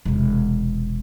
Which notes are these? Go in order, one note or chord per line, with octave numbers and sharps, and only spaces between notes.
E1 C3